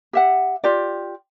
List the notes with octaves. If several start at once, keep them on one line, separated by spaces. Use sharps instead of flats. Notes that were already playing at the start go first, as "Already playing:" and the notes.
G4 E5 F#5
F4 G4 D5